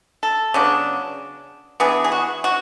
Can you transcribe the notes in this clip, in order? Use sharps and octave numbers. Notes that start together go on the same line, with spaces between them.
A4
C#3 F#3 B3 D4
E3 B3 D4 G#4
G#4
F#4
F#4